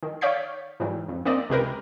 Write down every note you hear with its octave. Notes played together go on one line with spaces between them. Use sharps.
D#3
C#5 D5 F5 G6 B6
G#2 E3 F#3 G3
F2
A#3 C4 D5 D#5
C#2 C3 G4 A#4 B4